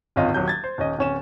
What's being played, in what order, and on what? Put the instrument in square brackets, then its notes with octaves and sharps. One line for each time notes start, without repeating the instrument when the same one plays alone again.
[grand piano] D1 G#1 C#4 F4 D#5
D#1 F#3 G6
G#6 A6
C5
D#1 C#4 D#5
D1 C#4 E7